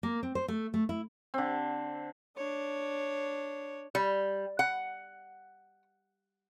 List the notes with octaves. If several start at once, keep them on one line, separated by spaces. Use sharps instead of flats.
A#3
C4
C5
A3
A3
E4
D3 C4
D4 C#5
G3
F#5